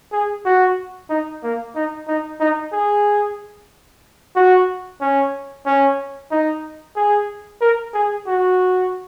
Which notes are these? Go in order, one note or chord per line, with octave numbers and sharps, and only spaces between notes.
G#4
F#4
D#4
A#3
D#4
D#4
D#4
G#4
F#4
C#4
C#4
D#4
G#4
A#4
G#4
F#4